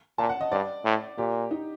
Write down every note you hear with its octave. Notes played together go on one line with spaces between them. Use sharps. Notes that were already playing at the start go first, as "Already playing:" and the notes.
A#2 A5
F#5
D#5
G2 D5
A2
A#2 G4
D#4